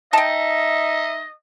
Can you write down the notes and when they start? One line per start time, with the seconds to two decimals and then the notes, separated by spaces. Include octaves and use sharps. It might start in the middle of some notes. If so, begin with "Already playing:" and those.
0.13 D#4 D#5 E5 G5 A5